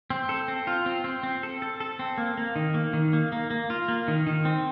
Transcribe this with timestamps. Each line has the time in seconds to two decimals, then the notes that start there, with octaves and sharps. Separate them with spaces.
0.10 C4
0.29 A4
0.48 C4
0.67 F4
0.86 C4
1.04 C4
1.23 C4
1.43 A4
1.62 A4
1.80 A4
1.99 C4
2.18 A#3
2.38 A#3
2.56 D#3
2.74 A#3
2.93 D#3
3.13 A#3
3.32 A#3
3.50 A#3
3.70 F4
3.88 A#3
4.08 D#3
4.27 D#3
4.45 C4